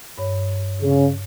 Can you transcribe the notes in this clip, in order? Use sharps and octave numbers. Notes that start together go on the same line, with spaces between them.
G2 C#5
C#3